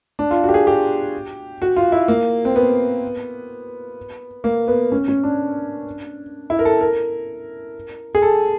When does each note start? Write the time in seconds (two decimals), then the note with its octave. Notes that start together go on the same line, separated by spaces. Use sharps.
0.19 D4
0.31 F4
0.43 F#4
0.49 G4
0.54 G#4
0.67 G4
1.62 F#4
1.76 F4
1.92 E4
2.08 A#3
2.45 C4
2.56 B3
4.44 A#3
4.68 B3
4.92 C#4
5.08 C#4
5.23 D4
6.50 E4
6.59 A#4
6.65 A4
6.81 A#4
8.15 G#4
8.22 A4